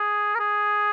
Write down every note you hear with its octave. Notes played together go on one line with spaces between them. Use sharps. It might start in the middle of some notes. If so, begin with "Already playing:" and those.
Already playing: G#4
A#4
G#4